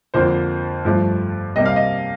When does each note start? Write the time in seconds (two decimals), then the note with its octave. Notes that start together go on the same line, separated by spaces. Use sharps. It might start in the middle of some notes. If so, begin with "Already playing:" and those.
0.14 F2 D3 F3 A#3 C5
0.85 G2 F3 A3
1.56 C3 G3 A#3 D#5
1.65 F5
1.76 D#5